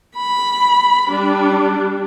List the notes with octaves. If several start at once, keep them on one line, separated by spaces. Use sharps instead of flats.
B5
G3 D4